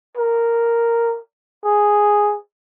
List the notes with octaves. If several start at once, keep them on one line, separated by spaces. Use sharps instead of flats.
A#4
G#4